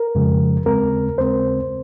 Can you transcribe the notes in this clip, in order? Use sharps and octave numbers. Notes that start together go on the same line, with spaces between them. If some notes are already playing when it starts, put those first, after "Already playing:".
Already playing: A#4
F2 C#3 F3 G#3
D#2 C#3 G#3 C4 A#4
D#2 C#3 G#3 C4 C5